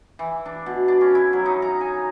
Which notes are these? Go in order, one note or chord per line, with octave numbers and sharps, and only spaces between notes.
E3
D4
B2
D4
C#4
E4
F#3
D#4
A#5
G#5